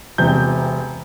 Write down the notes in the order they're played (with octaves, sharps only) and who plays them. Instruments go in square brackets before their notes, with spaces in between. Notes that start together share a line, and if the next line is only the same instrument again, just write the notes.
[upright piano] E1 C3 G6